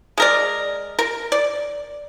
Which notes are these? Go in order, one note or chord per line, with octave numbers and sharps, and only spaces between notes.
G#3 A#4 D5
A#4
D5